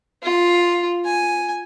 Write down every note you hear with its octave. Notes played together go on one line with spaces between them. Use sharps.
F4
G#5